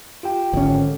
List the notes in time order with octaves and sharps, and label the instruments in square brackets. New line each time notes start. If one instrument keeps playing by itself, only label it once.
[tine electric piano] F4 G4 G5
[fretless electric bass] G#1 C#4 [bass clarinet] D3